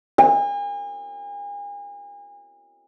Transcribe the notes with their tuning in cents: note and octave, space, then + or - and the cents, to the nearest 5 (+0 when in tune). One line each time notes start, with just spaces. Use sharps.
G#5 -40